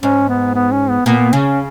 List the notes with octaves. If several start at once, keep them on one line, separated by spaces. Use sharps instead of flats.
G#2 C#4
B3
B3
C#4
B3
A#2 B3
C#3 C#4